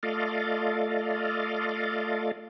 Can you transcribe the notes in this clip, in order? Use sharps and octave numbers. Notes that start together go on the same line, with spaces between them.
A3 F4 A4 D5 D#5 F5